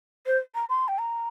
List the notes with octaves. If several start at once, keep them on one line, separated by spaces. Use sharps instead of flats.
C5
A#5
C6
G5
A#5